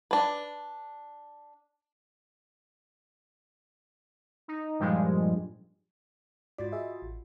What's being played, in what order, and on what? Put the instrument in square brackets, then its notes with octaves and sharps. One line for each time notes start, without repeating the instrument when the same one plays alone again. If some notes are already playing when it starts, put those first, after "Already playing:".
[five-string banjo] D4 B4
[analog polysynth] D#4
G2 A#2 F3 G3 G#3
[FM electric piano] G#2 D5 [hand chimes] F4 F#4 A6
[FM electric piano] G#4 D#5 E5
A1